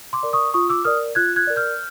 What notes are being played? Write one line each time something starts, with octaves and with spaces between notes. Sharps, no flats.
C6 D6
A#4 D5
C#6 D#6
F4 C#6 D#6
D6 E6
A#4 D5 D#6 F6
F4 F#6 G#6
F#6 G#6
A#4 D5
F6 G6